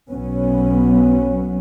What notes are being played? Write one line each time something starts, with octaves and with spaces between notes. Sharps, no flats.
B1 F#3 B3 C#4